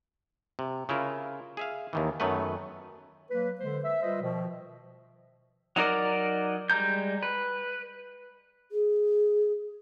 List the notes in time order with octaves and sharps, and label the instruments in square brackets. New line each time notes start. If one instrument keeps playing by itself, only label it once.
[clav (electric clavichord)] C3
C#3 E4 F4 A#4
G#4 E5 F5
D#2 D#3 E3
F#2 D#3 F#3 A3 B3 B4
[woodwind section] F#3 A#3 B4
D3 G#3 C5
E5
G3 F4 B4 C5 D#5 E5
B2 D#3 F3
[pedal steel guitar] F#3 D#4 A#4 D5
G3 G#3 A#5 G6
B4
[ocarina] G#4